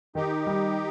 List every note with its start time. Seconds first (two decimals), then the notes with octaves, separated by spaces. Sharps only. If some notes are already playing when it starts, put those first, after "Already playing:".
0.15 D#3 D#4 G4
0.46 G3